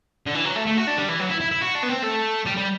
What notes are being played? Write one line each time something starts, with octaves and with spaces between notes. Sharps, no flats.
D3
E3
F#3
A3
A3
F#4
D4
G3
E3
F#3
E4
E4
E4
F#4
D4
B3
C4
A3
G3
G3